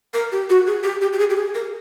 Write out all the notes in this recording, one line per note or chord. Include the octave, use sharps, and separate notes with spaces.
A#4
G4
F#4
G#4
G4
G4
G4
G#4
G4
G#4
A#4